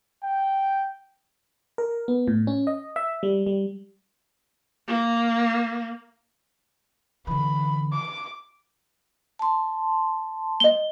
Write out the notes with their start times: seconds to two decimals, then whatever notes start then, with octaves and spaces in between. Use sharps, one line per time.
0.23 G5
1.78 A#4
2.08 B3
2.28 A2
2.47 C#4
2.67 D#5
2.96 E5
3.23 G3
3.46 G3
4.88 A#3
7.27 D3 E3 B5
7.92 D6
9.39 A5 C6
10.60 D#5 G7